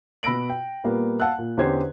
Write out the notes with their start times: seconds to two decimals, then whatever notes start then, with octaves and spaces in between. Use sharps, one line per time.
0.23 B2 B5 E6 A#6 D7 F#7
0.50 G5
0.84 A#2 G3 A#3 B3
1.20 F5 F#5 A5 E6 F#6
1.38 A#2
1.57 E2 D3 C#4 G4 C5 G#6